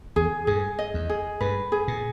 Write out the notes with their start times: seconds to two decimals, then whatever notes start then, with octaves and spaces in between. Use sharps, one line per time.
0.16 E2 G#4
0.47 G2 G#4
0.79 D#5
0.94 E2
1.10 G#4
1.41 G2 B4
1.72 G#4
1.88 A#2